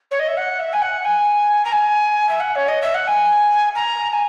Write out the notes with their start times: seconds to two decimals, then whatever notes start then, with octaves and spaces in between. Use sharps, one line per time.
0.11 C#5
0.19 D#5
0.27 E5
0.37 F#5
0.59 E5
0.72 G#5
0.81 F#5
1.04 G#5
1.64 A#5
1.72 G#5
2.28 E5
2.40 F#5
2.55 C#5
2.68 D#5
2.82 E5
2.94 F#5
3.07 G#5
3.75 A#5
4.09 A#5
4.13 G#5